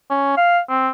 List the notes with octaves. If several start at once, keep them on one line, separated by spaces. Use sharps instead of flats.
C#4
F5
C4